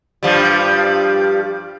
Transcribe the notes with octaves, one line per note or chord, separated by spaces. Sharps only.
G2 F3 G3